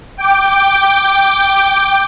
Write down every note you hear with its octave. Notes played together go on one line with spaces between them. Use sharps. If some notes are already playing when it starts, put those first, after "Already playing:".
G5 D6